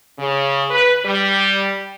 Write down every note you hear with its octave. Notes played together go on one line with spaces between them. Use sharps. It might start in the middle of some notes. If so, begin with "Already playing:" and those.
C#3
B4
G3